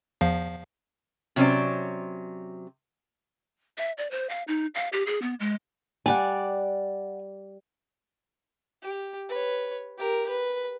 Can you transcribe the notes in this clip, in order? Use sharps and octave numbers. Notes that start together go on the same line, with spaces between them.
E2 F3 F5
C3 F#3 C#4 C5 D5
E5
D5
C5
F5
D#4
F5
G4
G#4
B3
G#3
G3 D5 F#5 G#5
G4
B4 C#5
G4 A#4
B4